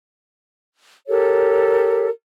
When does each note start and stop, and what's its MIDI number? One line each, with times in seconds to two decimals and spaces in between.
1.08 2.08 67
1.08 2.08 69
1.08 2.08 70
1.08 2.08 73